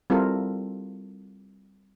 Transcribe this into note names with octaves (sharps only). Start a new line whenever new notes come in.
G3 C4 E4 F4 A4 A#4